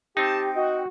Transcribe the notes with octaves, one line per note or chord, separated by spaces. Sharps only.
C4 D#4 G4 G5 A5
F#4 D#5